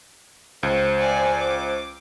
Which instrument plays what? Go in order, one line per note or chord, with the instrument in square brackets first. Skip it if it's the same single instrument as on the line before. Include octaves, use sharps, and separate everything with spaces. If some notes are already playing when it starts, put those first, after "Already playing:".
[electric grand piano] C#2 [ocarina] C5
[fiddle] D5 G#5
D6